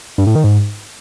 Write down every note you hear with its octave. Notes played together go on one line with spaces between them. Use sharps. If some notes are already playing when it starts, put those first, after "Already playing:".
G2
A2
D#3
G#2